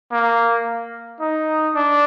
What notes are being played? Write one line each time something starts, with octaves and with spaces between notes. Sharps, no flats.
A#3
D#4
D4